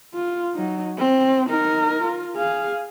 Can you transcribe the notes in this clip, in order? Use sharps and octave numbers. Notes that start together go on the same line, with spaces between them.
F4
F#3 D#4
C4
D#4 A#4
F4
G#4 F5